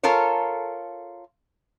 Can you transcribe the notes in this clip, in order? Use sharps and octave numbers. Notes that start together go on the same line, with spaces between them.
F4 A4 A#4 C#5